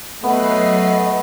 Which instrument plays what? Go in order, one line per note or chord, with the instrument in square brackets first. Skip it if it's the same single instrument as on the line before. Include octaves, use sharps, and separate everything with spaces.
[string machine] F#3 B4 C7 [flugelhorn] A3 [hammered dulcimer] B3 [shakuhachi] D#5